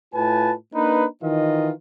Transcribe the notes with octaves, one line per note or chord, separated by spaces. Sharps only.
A2 F4 B4 G#5 A5
A#3 D4 D#4 B4
D#3 E3 D#4 F4 D#5